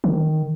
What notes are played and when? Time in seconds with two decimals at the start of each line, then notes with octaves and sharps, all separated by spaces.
0.04 D#3